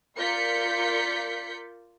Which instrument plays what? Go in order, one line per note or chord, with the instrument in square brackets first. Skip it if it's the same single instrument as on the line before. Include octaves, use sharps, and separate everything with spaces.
[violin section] F4 A#4 D5 G6 B6 C#7